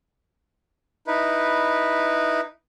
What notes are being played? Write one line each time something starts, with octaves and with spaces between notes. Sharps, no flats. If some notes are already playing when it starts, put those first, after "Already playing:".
D#4 E4 B4